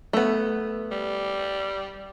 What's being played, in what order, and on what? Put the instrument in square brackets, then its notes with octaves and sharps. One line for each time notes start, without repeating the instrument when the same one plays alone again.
[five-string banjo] A3 B3
[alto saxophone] G3